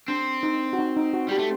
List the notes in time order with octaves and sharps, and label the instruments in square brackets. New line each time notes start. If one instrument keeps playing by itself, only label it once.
[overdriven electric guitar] C4 [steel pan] D4
[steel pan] D#4
F#4
D#4
D#4
F#4
[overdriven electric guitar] G3 [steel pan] G4
[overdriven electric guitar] A3